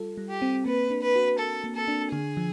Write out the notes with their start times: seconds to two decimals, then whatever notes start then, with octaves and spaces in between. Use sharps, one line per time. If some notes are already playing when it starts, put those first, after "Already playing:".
Already playing: G3 F4 A4
0.17 G3
0.29 G4
0.42 C4
0.66 A#3 B4
0.90 D4
1.02 B4
1.15 F#4
1.39 A4 A#4
1.64 A#3
1.76 A4
1.88 D4
2.12 D3 G#4
2.37 F3